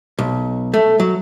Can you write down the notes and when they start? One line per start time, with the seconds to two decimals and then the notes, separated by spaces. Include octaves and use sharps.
0.19 B1
0.74 A3
1.00 F#3